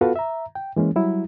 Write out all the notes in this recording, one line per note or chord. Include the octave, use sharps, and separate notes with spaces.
B3 F4 F#4 A4 B4 F5
E5 A#5
G5
E3 G#3 A#3 C#4
F#3 G3 E4